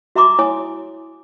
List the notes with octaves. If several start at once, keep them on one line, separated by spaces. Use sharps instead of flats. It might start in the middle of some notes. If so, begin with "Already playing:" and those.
F#4 E5 A#5 C6 D6 D#6
E4 C#5 G#5 D#6